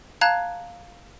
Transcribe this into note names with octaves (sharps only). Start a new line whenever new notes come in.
F5 A5 A#5 F#6 G#6